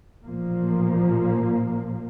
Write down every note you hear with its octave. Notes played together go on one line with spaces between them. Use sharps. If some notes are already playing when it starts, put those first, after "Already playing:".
A1 A#2 F3 A#3